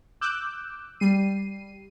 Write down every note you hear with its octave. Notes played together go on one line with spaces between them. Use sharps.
D6 E6 F#6 G6
G3 C7 D#7